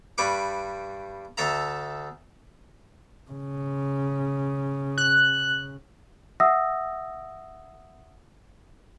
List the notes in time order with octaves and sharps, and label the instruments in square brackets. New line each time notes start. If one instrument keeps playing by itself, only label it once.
[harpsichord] G2 G3 B4 C#6 D6
D2 A4 E5 A#5
[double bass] C#3
[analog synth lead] F#6
[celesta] E5 F#5 D#6 E6 A#6